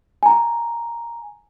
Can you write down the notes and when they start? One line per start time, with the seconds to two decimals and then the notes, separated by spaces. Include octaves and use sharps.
0.23 G#5 A#5